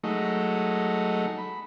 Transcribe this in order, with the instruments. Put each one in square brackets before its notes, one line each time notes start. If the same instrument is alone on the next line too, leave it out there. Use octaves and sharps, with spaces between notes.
[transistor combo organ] F#3 G#3 A3 D#4
B5